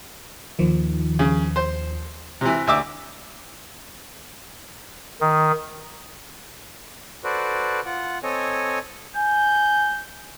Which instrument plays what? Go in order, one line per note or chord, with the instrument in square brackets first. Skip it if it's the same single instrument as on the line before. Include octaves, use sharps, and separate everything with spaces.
[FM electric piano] D#2 D#3 F3
[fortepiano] C#3
C5
C3 E3
D2 E5 D6
[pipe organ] D#3
[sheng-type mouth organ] F#4 A4 B4 C5 D5
F4 F#5
C4 A4 C#5 D#5 G#5
[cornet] G#5 [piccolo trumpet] G6